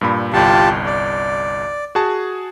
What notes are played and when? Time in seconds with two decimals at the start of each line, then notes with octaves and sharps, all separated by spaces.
0.01 G2 A#2 B5
0.33 G1 C2 F4 G4 A5
0.86 D5
1.95 F#4 G#4 A5